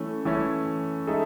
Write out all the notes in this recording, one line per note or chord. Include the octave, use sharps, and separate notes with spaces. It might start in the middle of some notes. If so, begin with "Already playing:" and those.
Already playing: E3 A3 C#4
E3 A3 C#4
G#3 D#4 A4 E5